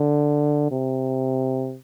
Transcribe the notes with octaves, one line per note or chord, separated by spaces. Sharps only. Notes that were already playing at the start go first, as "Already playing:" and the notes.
Already playing: D3
C3